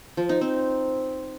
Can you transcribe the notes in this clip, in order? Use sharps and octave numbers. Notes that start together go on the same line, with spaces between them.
F3
D#4
C4